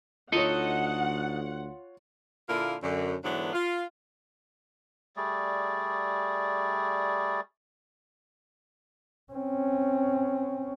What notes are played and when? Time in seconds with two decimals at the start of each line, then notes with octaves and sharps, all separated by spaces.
0.32 D2 D#4 F4 A4 C#5 D#5 F#5
2.48 A#2 D3 A#3 E4 F4 A#4
2.82 F#2 D3
3.23 G#2 D3 E3 F#3 B3 D4
3.53 F4
5.16 G3 A3 G#4 D5
9.33 C4 C#4